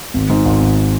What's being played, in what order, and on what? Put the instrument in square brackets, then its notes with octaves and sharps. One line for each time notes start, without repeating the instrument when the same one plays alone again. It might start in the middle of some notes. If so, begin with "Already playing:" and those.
[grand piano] G#1
G#2
G#1
G#1